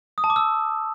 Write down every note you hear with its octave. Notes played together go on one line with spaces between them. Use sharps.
D#6
A5
D6
E6